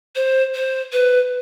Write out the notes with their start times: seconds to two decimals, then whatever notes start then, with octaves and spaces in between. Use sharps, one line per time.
0.16 C5
0.55 C5
0.92 B4